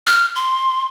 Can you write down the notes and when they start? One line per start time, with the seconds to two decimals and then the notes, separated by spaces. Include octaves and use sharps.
0.07 F6
0.36 C6